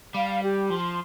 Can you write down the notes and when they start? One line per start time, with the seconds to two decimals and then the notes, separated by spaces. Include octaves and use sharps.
0.14 G3 F5
0.43 G4
0.70 F3 C6